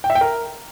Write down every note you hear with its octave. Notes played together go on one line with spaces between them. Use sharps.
G5
E5
G5
A#4